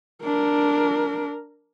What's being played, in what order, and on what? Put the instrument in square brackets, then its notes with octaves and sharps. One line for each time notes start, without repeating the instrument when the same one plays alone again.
[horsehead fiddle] D4 A#4